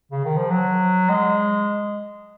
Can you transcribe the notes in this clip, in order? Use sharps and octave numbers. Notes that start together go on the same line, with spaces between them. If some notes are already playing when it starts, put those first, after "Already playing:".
C#3
D#3
F3
F#3
G#3